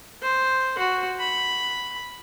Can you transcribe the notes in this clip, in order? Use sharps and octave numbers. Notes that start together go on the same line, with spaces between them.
C5
F#4
B5